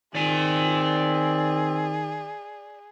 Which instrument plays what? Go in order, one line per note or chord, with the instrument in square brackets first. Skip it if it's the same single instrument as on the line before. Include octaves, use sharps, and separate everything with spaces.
[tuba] D#3 [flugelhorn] C4 [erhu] G#4 [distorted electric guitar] D5 G#5